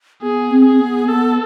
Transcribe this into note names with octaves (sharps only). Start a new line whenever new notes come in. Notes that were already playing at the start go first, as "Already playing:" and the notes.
B3 G#4
C4
C4 G#4
B3
B3 A4